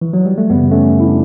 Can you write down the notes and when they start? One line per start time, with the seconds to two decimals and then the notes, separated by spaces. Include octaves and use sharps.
0.01 E3
0.13 F#3
0.26 G3
0.38 A3
0.50 F#2 C#3 E3 G3 B3
0.71 A3 C#4
1.00 E4
1.08 D4